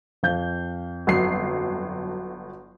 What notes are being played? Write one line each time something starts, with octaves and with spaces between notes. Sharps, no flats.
F2 F5 G6
G1 F#3 C7